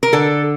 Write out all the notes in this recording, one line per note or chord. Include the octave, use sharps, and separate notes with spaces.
A#4
D3 A4